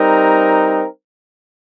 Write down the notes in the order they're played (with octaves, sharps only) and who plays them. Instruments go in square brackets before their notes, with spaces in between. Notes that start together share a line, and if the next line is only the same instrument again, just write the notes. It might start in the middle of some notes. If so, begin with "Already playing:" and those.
Already playing: [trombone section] G3 C4 D#4 A#4